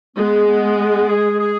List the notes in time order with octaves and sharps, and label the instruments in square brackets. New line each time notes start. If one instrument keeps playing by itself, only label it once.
[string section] G#3 [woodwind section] B3
[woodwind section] B3
B3
G#4
G#4